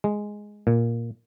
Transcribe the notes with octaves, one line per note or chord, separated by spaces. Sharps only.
G#3
A#2